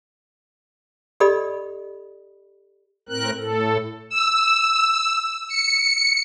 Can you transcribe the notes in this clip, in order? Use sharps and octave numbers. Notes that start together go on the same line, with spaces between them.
G4 A4 D5 D#5 B5 D#6
A2 C4 A#4 F#6
A2 A4
E6
C#7